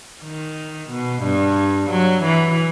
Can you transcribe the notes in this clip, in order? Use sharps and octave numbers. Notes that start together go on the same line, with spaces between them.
D#3
B2
G2
F#3
E3